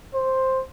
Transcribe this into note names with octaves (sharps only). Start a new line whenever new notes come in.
C5